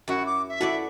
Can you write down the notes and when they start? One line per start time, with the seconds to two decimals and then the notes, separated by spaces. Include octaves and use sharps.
0.08 F#2 E4 F#4
0.25 D6
0.49 E5
0.61 E4 F#4 A4 B4 D5